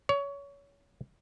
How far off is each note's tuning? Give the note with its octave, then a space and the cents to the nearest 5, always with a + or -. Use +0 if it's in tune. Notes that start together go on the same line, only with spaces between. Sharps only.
C#5 +25